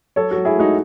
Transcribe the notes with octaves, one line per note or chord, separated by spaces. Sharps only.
F#3 A4 C#5
F#3 F#4 A4
E4 G#4
A3 D#4 F#4